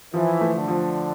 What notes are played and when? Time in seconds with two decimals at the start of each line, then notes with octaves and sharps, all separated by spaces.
0.14 E3 F3
0.41 A3
0.54 D3
0.68 F3